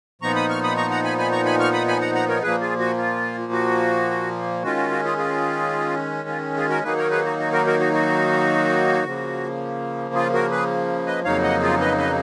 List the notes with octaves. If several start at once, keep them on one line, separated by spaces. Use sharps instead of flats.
A#2 F3 B3 D#4 A#5 C#6
B5 D#6
C#6 F6
B5 D#6
A#5 C#6
F#5 A#5
G#5 B5
G#5 B5
A#5 C#6
G#5 B5
C#6 F6
B5 D#6
G#5 B5
F#5 A#5
F#5 A#5
A#4 C#5
A#2 F3 A#3 G#4 B4
F4 G#4
F#4
F4
F#4
D#3 G#3 C#4 F4 F#4
F#4
F#4
F4 G#4
F4 G#4
F4
F4 G#4
F#4 A#4
D#3 F#3 A#3 D#4 G#4 B4
A#4 C#5
G#4 B4
F#4
F#4
F#4 A#4
F#4 A#4
F#4
F#4
C#3 F3 A#3
F4 G#4
F#4 A#4
G#4 B4
B4 D#5
F2 C#3 F#3 A#3 D#4 C#5 F5
D#5 F#5
F4 G#4
B4 D#5
B4 D#5